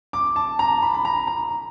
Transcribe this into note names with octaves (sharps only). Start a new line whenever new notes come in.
D6
A5
A#5
B5
B5
A#5
A#5